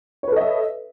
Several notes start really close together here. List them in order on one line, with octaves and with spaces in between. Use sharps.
C#5 B4 A4 D#5 E5